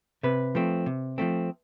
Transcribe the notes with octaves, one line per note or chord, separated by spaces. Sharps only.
C3 B4
F3 A3 C4
C3
F3 A3 C4